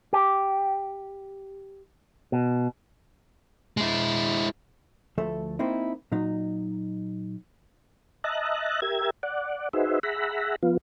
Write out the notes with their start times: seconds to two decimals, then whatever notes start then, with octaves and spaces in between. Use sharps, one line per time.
0.13 G4
2.32 B2
3.77 G#3 E4
5.18 D2 F3 A3 A4 E5
5.59 A#3 C4 D#4 E4
6.12 A#2 F#3 D#4
8.24 D#5 E5 A5 A#5 F#6
8.82 G4 A#4 E5 G#6
9.23 D5 F#5
9.73 D#4 F#4 G#4 B4 C5 E5
10.03 G#4 E5 F#5 A#5 B5
10.63 F3 B3 F4